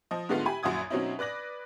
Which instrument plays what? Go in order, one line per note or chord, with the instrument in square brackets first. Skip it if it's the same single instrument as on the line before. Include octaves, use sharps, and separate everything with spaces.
[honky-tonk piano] F3 D#5
G#2 D3 G#3 A3 B3 F4
E4 G4 G#5 B5
A#1 F#2 E4 F#4 D#6 G#6
B2 F#3 C4 C#4 D#4 E4
B4 D5 F#6 A#6 F#7